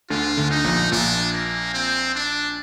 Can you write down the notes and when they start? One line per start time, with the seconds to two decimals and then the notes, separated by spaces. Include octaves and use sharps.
0.10 D2 D3 F4
0.37 D2 D3
0.51 D#4
0.64 A#1 A#2
0.92 A#1 A#2 D4
1.33 A#3
1.74 C4
2.15 D4